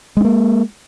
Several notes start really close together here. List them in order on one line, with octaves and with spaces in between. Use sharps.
G#3 D4 A#3